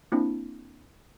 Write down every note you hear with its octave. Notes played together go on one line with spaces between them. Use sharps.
A#3 C4 D4 E4